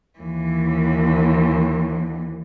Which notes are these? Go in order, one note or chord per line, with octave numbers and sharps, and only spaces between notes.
D#2 E3